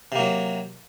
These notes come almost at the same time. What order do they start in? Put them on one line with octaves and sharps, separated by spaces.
C3 A#3 F#3